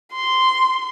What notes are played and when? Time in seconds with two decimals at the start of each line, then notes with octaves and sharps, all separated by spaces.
0.13 C6